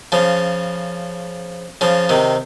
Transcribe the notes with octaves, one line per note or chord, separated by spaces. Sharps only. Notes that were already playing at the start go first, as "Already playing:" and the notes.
C#3 F3
C#3 F3
C3 D#3